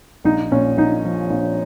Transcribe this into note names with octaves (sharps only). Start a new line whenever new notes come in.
A#1 D#4
A#2 C#4
A#1 D#4
F3
A#1